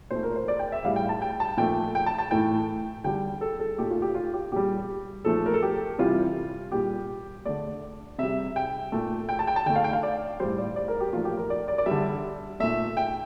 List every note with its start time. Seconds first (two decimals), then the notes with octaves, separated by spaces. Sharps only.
0.11 A#2 A3 C5
0.23 A#4
0.36 C5
0.48 D5
0.59 G5
0.72 E5
0.84 A2 G3 F5
0.96 G5
1.09 A5
1.22 G5
1.40 A5
1.57 A#2 F3 A3 G5
1.95 G5
2.06 A5
2.18 A5
2.31 A2 E3 A3 G5
3.04 D3 G3 G5
3.41 A4
3.60 A4
3.78 A#2 A3 G4
3.90 F4
4.02 G4
4.15 F4
4.34 G4
4.52 A#2 G3 G4
5.25 A#2 F3 A3 A4
5.46 A#4
5.54 A4
5.62 G4
5.99 C3 E3 G3 F4
6.72 A#2 G3 G4
7.45 D3 A3 D5
8.18 C3 G3 E5
8.56 G5
8.92 A#2 A3
9.29 G5
9.39 A5
9.47 G5
9.56 A5
9.66 D3 A3 G5
9.76 F5
9.84 G5
9.93 F5
10.03 D5
10.40 A2 G3 C5
10.58 D5
10.76 D5
10.88 A#4
11.00 G4
11.13 A#2 F3 A3 F4
11.25 G4
11.37 A#4
11.50 D5
11.68 D5
11.78 D5
11.86 G3 E5
11.91 D3
12.60 A#2 A3 E5
12.97 G5